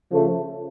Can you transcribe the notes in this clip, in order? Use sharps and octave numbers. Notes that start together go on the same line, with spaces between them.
C#3 F3 A3